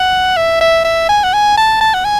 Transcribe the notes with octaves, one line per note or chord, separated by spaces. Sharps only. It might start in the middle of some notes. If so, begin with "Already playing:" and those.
Already playing: F#5
E5
E5
E5
G#5
F#5
G#5
A5
A5
F#5
G#5